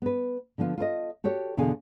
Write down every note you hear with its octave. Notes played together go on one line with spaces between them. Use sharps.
B3 B4
D3 F3 B3 F4
F4 A4 C5 D#5
F#4 G4 A4 C#5
E2 B2 D3 G#4 F5 G#5